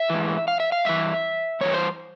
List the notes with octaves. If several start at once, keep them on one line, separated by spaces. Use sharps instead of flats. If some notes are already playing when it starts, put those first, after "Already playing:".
Already playing: E5
G#2 E3
F5
E5
F5
G2 E3 E5
G2 E3 C#5
C5